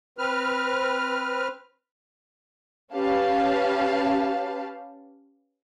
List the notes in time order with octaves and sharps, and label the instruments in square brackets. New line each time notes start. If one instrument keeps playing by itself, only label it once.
[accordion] C4 B4 F6
[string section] C#4 G4 B4 F5 A5